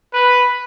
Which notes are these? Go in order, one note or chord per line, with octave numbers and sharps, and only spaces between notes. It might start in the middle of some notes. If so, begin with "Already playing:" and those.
B4